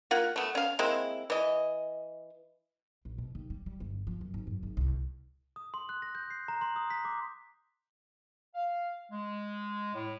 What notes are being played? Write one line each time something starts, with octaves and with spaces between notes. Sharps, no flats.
A#3 F4 F#5
A3 B3
C#4 F5
G#3 A#3 C4 E4
E3 D#5
A#1
B2
D#2
G3
G3
G1
F3
F#2
G#1
F#2
G#1
C2
D#6
C6
F#6
A#6
G6
C7
A#5
C6
D#6
B6
D6
F5
G#3
A2